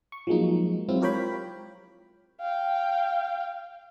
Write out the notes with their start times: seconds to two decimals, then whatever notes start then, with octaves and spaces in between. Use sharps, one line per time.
0.12 C#6
0.27 F3 F#3 G#3 A#3 D#4
0.88 F#3 G#3 C4 E4 F4
1.01 F4 G4 A#4 C#5 G5 B5
2.41 F5 G5